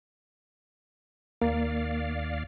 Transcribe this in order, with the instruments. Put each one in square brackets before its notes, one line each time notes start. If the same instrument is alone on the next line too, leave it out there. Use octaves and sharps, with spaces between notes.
[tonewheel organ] D#2 D5 F5 [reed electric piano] A#3